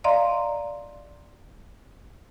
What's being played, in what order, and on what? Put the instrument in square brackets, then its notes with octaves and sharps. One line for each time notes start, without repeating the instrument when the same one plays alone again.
[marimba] D5 D#5 F5 A#5 C6